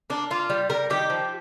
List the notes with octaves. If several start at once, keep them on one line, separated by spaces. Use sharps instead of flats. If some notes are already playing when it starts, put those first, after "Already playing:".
A#3 D4
A#3 F4
G3
G3 A#4
D#3 G4
F3